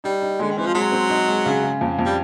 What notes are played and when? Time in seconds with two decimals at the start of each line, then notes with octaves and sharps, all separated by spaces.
0.04 G3 D#4
0.22 D#4
0.39 D3 G#3
0.51 D#3
0.57 E3 C4
0.66 F3
0.74 F#3 G#3
0.92 C4
1.10 D#4
1.28 G#3
1.46 C#3
1.63 C#3
1.81 F2
1.99 F2
2.05 G3